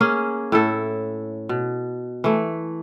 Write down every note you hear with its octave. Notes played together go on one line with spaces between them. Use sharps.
A#3 C#4 G#4
A2 E4 A4
B2
E3 A3